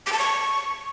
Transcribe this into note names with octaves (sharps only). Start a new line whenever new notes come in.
D6
A5
C#6